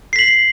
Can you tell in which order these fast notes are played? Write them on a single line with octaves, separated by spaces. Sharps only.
C7 B6 F#7